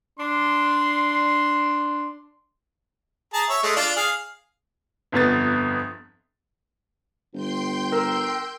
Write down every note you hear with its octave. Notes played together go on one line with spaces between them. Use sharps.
D4 C6
G#4 A5 A#5
C#5 E5
G#3 A3
D4 F4 D5
G#4 F5
G1 F2 B3 A6
G1 G5 C6 G6
A#4 E6